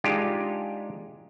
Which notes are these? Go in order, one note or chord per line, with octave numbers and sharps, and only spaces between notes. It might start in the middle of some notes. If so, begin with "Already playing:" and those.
G#3 D4 D#4 F4 G4